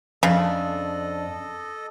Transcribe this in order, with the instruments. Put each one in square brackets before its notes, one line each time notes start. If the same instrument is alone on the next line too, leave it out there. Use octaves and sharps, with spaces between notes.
[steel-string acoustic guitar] F2 D4 [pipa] C#3 [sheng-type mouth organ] A4 D#5